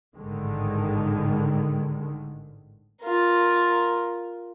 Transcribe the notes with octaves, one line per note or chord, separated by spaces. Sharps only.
A1 G#2 D3 D#3 G#3
F4 A#4